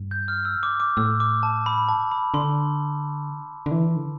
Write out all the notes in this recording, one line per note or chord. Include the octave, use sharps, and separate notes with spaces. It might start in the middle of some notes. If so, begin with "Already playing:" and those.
Already playing: G2
G6
F6
E6
D6
D6
A2 E6
D6
A5
B5
A5
B5
D3 C6
D3
E3
D3